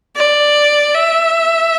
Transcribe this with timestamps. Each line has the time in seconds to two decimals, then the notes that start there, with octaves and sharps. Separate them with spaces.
0.16 D5
0.95 E5